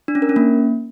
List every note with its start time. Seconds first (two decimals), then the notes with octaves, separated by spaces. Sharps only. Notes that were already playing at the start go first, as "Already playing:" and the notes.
0.08 D4
0.15 C#4
0.22 A#4
0.29 C#4
0.36 A#3